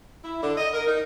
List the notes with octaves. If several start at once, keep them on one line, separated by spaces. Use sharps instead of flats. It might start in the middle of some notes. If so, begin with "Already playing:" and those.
E4
D3
D#5
A#4
D#4